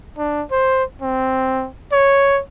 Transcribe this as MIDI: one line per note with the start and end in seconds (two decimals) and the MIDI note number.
0.18 0.43 62
0.51 0.84 72
1.02 1.68 60
1.92 2.41 73